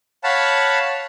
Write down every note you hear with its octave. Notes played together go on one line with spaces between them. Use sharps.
C#5 F5 F#5 A5 B5